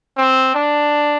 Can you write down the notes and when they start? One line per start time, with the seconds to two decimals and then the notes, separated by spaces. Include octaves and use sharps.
0.17 C4
0.55 D4